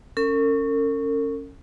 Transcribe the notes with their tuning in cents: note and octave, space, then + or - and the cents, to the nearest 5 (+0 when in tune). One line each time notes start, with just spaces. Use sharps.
C#4 +0 A#4 -45